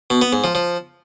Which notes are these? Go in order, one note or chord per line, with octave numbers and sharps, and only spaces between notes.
B2
B3
G#2
F3
F3